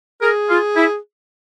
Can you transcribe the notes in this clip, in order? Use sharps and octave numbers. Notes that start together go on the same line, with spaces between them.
G#4 A#4
F4
E4